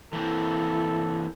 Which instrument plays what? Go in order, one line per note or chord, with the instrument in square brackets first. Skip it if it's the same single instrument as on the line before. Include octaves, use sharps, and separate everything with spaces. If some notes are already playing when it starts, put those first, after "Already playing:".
[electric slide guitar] E3 A#3 C4 [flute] E4 [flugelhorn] A4